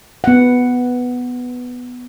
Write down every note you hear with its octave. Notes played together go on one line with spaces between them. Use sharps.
B3 F#5